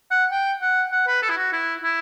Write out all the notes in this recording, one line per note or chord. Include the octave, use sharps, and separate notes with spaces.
F#5
G5
F#5
F#5
B4
A4
E4
F#4
E4
E4